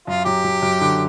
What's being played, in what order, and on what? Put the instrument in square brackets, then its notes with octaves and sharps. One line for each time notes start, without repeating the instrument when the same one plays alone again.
[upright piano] F#2 [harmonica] F4
[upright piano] F#3 [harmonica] G4
[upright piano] F#3
F#2
D3